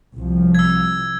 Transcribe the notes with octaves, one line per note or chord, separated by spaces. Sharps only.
C2 F3
E6 G#6